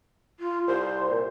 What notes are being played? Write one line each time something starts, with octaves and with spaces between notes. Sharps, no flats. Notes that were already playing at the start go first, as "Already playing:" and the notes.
F4
C2 C5
A#2